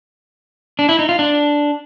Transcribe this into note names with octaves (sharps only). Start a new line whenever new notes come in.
D4
E4
D#4
F4
D4